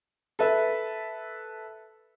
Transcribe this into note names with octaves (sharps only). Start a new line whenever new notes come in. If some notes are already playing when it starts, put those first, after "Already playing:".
A4 B4 E5